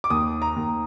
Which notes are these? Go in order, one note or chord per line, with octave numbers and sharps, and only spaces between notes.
D6
D#2 D#6
A#5
D#2